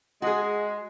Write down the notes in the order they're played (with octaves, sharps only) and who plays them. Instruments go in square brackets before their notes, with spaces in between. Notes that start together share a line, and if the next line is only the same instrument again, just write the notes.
[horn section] G#3 [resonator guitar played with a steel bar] F#4 G#4